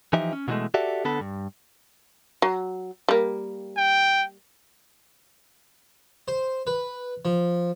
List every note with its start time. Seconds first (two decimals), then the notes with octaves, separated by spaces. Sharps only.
0.13 E3 F3 D#4 G4 E5
0.33 C#4
0.48 B2 D3 E3 F3 G#3 A3
0.74 F#4 G4 A4 D5 E5
1.05 D3 B3 A4 A5 B5
1.21 G2
2.42 F#3
3.08 G3 A#3
3.77 G5
6.28 C5
6.67 B4
7.25 F3